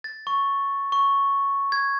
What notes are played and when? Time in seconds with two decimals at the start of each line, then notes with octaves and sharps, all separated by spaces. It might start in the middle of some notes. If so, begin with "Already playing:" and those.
0.04 A6
0.27 C#6
0.92 C#6
1.72 G#6